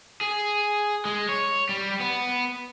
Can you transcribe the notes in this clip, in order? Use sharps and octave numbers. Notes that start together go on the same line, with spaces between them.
G#4
G#3
C#5
G3
B3